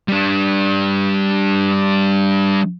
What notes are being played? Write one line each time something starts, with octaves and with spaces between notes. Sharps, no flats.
G3 D4